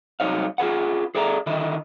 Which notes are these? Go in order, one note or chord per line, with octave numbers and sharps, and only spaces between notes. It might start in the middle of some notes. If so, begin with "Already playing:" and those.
C2 A2 F#3 D#4 C#5 F5
F4 G#4 B4 F#5
G#4 A4 D5 E5 A5 A#5
D3 D#3 E4 D#5